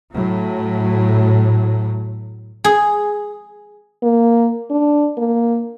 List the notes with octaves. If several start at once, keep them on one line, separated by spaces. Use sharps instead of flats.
A2 F#3
G#4
A#3
D4
A#3